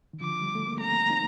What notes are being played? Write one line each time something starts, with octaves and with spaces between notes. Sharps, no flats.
D#3
D3 F3 D6
G3
A3
A#3
A3 C4 A#5
C4 D#4